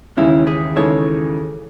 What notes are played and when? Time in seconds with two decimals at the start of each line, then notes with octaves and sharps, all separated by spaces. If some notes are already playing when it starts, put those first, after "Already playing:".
0.17 D#2 C#3 E3 G#3 C#4 D#4 E4
0.47 E4 G#4
0.76 D#2 C#3 E3 G#3 D#4 A4 C#5